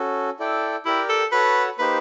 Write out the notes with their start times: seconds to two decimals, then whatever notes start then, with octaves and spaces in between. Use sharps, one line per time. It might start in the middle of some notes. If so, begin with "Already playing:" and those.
Already playing: C#4 F#4 A4
0.39 E4 A4 D5 G5
0.85 E4 G4 A#4 D5 G5
1.09 A4
1.32 F#4 A4 B4 C#5 F#5 A5
1.79 A#3 D#4 G4 B4 C5